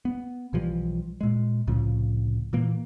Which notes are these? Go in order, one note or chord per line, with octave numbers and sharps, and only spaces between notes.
B3
B1 E3 F3 G3
A#2 G#3
C2 A2 C#3 F3
A#2 E3 A#3